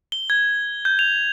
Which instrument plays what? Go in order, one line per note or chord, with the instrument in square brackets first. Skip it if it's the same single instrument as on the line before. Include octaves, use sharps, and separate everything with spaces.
[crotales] G7
G#6
G6
F7